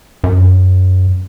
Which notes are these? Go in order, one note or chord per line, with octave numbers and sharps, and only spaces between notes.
F#2